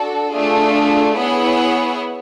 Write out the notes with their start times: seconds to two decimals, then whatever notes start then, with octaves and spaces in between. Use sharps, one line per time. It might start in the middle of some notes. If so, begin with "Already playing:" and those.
Already playing: D4 F#4 A4
0.34 A3 D4 F4 G#4
1.16 B3 E4 G#4 C#5 F#5